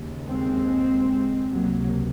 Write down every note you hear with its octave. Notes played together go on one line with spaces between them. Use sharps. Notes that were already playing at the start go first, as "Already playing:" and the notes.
Already playing: D#2 C#3
G#3 C4
C#2 C3 F#3 A#3